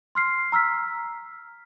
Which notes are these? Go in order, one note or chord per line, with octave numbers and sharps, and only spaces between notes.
C6 F6 C7
A#5 E6 F6 B6